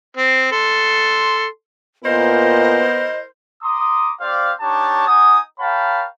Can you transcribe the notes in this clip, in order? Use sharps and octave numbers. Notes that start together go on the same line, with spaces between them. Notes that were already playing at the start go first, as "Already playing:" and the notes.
C4
A4 C6
A#2 B3 E4 A#4 C5 D#5
A#5 C6 D6 D#6
C4 G4 C5 D5 F5
D4 D#4 G4 C#5 A5
D#4 F#5 G#5 D#6
A#4 C#5 F5 G5 A5 B5